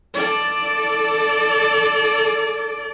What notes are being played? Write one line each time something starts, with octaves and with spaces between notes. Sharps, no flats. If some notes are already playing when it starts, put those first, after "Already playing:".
A4 D5